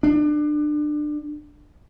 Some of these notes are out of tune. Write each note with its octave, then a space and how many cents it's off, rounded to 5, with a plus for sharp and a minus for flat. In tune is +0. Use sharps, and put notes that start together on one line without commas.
D4 +25